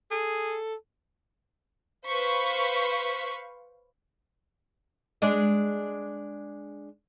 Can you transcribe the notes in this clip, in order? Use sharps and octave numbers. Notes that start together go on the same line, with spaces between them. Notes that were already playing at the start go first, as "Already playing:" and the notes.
G#4 A4
B4 C5 F5 C#6 B6
G#3 D4 D#5